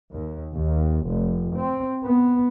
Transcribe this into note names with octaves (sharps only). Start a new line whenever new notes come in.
D#2
D#2
F1
C4
B3